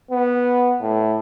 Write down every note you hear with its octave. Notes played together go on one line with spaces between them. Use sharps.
B3
A2